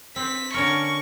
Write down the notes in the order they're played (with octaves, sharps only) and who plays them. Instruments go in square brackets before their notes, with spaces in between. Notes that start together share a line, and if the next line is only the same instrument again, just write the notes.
[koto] C4 [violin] B6
[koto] D3 C#4 A#4 [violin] C#6